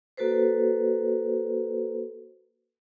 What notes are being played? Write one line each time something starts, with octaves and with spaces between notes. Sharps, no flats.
A#3 F#4 A4 B4 C5